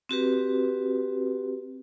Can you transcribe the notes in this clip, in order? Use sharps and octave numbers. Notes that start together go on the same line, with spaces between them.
C4 F#4 G4 B4